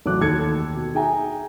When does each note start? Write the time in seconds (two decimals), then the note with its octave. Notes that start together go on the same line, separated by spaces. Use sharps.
0.06 A1 F#3 A3 D6 F#6
0.20 D#2 A4 G#6 C#7
0.75 B2
0.94 D#4 G#4 E5 G5 G#5 A#5